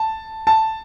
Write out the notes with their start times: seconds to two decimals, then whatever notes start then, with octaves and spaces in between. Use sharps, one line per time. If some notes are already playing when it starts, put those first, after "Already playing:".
Already playing: A5
0.47 A5